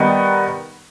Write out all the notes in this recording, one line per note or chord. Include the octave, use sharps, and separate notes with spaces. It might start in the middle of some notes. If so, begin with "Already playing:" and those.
Already playing: D#3 G3 B3 D#4